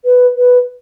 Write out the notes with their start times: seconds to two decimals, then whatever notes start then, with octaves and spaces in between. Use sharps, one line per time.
0.05 B4
0.36 B4